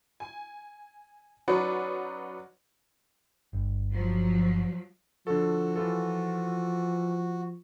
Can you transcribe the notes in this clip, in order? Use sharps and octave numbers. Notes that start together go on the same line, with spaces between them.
G#5
F#3 C#4 D#4 F#4 B4 D5
G1
F3 F#3
D3 F3 F#4 A4
E3 F4 A4